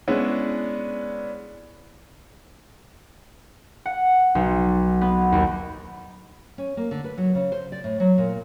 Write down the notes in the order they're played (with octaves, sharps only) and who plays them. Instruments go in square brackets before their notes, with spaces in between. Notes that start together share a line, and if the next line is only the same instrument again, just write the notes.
[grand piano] G#3 B3 C#4 D4 E4
[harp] F#5
B1
B3
D#2
[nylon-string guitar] C#4
A#3
D3
B4
F#3
C#3
C5
D5
A2
F#3
A#2